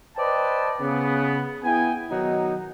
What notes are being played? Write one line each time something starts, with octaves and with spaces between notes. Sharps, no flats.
B4 C5 D5 D#5 G5 A5
C#3 B3
B3 E4 G#4 G5 G#5
B2 D#3 F#3 D#4